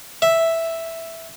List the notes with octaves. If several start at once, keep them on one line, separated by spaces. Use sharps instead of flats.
E5